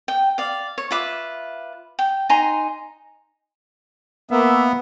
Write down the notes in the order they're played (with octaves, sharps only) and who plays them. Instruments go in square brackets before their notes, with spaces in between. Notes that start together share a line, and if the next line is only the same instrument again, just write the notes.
[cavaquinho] G5
D5 F5
C#5
F4 B4 E5 D6
G5
D#4 G#5 A#5 C6
[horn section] A#3 E5 [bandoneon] B3